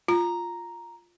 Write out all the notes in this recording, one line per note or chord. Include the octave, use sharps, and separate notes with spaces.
F4 A#5